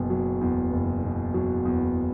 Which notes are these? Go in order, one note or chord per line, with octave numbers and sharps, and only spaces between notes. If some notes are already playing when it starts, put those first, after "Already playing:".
Already playing: F#1 B2
F#3
E2
F#1
B2
F#3
E2